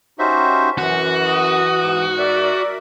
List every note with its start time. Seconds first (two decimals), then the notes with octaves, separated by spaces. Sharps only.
0.19 C#4 D#4 F#4 G4 C5 E5
0.78 F#2 E3 F#4 F#5
1.28 D#6
1.82 G#2
2.19 A#4 D5 E5 D6